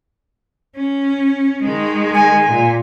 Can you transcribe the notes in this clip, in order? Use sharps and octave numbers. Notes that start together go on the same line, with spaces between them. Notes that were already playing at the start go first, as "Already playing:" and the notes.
C#4
D#3 G#3
G#5
A#2